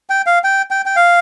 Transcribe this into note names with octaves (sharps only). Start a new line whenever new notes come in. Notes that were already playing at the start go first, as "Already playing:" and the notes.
G5
F5
G5
G5
G5
F5